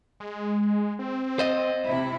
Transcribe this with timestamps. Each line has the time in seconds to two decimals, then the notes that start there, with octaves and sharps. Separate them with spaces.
0.20 G#3
0.99 C4
1.39 C5 D#5
1.87 C3 E4